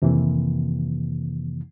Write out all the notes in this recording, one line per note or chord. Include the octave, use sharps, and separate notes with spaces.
F2 C3 D#3 E3 A#3